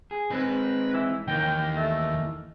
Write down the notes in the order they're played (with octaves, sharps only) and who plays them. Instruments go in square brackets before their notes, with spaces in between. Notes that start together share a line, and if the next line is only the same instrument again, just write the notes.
[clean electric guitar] G#4
[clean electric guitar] G#3 C4 D#4 [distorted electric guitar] B4
[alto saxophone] E3
[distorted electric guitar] D#2 [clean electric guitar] E3 A#3 D#4 [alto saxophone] G5
[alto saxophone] A3